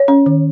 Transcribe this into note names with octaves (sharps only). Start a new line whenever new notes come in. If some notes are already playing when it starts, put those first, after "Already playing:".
Already playing: C#5
C#4
D#3